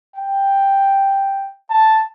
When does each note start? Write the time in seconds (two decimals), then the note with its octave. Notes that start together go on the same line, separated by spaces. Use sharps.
0.17 G5
1.71 A5